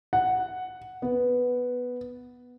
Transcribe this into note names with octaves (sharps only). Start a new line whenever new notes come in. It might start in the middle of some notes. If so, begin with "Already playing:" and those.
F#5
B3